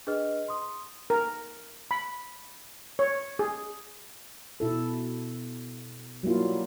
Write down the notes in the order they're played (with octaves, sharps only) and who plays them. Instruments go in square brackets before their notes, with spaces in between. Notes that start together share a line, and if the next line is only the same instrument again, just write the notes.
[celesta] D4 G#4 B4 D#5 F6
C6 D#6
[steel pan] A#4
B5
C#5
G#4
[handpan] B2 E4 A4
F#3 G3 A#3 E4 F4